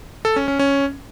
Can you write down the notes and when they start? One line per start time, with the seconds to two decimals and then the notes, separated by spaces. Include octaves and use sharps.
0.25 A4
0.36 C#4
0.48 C#4
0.59 C#4